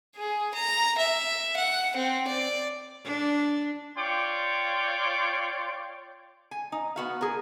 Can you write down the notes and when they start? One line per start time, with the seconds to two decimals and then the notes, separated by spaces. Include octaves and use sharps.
0.16 G#4
0.54 A#5
0.97 E5
1.56 F#5
1.96 C4
2.27 D5
3.05 D4
3.98 F4 C#5 D5 G5 C6 D6
6.51 G#5
6.72 D#4
6.96 B3 F#4 F5
7.21 G#4 A#4